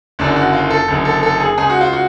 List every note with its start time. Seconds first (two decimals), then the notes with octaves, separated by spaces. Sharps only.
0.19 F#1 F#2 D3 D4
0.36 F#4
0.53 F4
0.71 A4
0.88 F#1 F#2 D3
1.05 A4
1.23 A4
1.40 G#4
1.57 C#2 C#3 G#4
1.70 F#4
1.81 F4
1.93 F#4